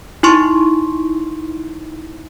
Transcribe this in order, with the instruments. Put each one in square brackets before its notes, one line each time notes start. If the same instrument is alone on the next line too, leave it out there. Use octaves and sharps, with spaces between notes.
[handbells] D#4 E4 C6 C#6